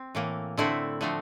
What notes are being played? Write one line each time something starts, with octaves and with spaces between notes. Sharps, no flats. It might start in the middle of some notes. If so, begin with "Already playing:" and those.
Already playing: C4
A2 E3 A#3
D3 A3 C4 E4
D3 F3 A3 C4